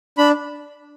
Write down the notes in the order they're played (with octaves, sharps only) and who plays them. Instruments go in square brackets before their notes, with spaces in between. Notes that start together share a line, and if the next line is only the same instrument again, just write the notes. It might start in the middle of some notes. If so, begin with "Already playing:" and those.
[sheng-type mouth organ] D4 B5